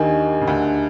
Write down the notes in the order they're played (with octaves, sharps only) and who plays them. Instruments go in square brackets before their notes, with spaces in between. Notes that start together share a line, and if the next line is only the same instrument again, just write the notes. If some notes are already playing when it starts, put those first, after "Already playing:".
Already playing: [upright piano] D#2 D#3 [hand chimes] D4 G4 A#4 D#5 G#5
[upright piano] C#3
D2 D3